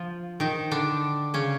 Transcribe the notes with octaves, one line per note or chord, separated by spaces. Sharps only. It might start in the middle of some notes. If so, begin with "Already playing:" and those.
Already playing: F3 F4
D#3 D#4
D3 D4
C#3 C#4